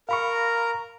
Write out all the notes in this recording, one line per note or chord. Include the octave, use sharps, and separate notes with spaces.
A#4 F5 A#5 B5 C#6